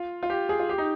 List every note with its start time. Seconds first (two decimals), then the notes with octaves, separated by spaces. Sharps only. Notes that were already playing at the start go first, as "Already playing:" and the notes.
Already playing: F4
0.23 F4
0.30 G4
0.49 G#4
0.59 F4
0.69 G4
0.78 D#4